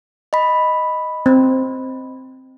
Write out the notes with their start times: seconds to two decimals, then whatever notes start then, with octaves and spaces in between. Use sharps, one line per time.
0.33 D#5 B5
1.26 C4